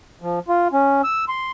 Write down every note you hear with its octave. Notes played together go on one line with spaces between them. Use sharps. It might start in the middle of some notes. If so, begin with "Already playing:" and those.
F3
F4
C#4
E6
C6